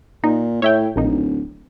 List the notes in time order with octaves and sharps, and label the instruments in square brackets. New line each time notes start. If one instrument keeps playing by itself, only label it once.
[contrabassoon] A#2 [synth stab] D#4
[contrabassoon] A2 [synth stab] C#5 E5 G5
[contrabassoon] D1 [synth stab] A#1 A#3 D#4